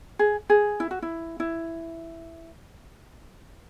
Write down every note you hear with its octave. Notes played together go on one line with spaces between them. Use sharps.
G#4
G#4
E4
F#4
E4
E4